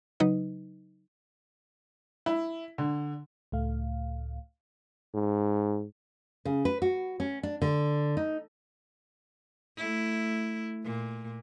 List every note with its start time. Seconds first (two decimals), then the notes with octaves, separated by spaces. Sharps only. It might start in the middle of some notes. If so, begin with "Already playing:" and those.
0.20 C#3 F#3 D#4 B4 D#5
2.26 E4
2.78 D3
3.52 C#2 A2 A3 F5
5.14 G#2
6.45 C#3
6.65 B4
6.82 F#4
7.20 C#4
7.43 D4
7.62 D3
8.17 D#4
9.77 A3 E4
10.84 A#2